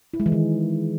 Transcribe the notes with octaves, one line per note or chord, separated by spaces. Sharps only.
E4
G#3
E3
D#3